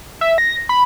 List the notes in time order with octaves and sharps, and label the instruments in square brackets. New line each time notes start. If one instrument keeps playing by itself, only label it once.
[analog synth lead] E5
A#6
B5